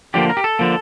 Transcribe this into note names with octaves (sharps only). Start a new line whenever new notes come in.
D3 F3 A#3 G4
A#4
G4
A4
D3 F3 A#3